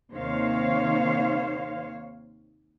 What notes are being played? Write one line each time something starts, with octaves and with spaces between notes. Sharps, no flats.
D#2 C3 D#3 C5 C#5 F5